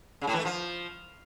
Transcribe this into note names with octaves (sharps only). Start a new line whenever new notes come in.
C#3
A2
E3
A3
F3